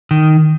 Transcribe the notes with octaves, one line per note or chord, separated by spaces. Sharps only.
D#3